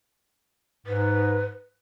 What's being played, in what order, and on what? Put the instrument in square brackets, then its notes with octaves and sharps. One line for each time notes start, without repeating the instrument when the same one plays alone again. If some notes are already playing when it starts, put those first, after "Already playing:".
[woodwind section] G#2 [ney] B4